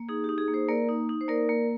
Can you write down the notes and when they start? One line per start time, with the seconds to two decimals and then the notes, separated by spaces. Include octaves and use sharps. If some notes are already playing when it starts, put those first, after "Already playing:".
Already playing: A#3
0.09 D#4 G#4
0.24 G4
0.29 D#4
0.38 G#4
0.48 A#3
0.54 G#4 C5
0.68 A#3 A#4 D5
0.89 D#4
1.09 D#4
1.21 C5
1.28 A#3 A#4 D5
1.49 A#3